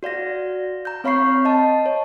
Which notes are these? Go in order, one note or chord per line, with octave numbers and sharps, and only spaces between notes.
F#4 D5 F5 A#6
A#5 G6
C4 C#5 F5 B5 C#6 C7
D#5 A5
C#5